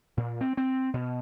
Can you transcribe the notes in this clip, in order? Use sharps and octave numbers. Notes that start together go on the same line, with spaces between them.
A#2
C4
C4
B2